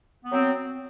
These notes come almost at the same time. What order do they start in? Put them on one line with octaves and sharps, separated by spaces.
B3 F#3 C4